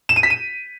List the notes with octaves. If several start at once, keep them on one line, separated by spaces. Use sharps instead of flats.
E7
D#7
B6
D#7